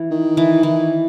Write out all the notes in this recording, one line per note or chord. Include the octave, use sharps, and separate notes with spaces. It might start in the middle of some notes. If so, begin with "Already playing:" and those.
Already playing: E3
D#3
E3
E3